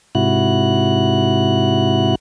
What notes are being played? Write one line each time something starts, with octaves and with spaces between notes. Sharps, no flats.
G#2 C3 E4 F#4 F#6